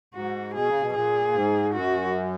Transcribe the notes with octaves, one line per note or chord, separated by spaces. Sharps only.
G#2 F#4
B2 G#4
C#3
B2
A#2 G#4
G#2
F#2 F#4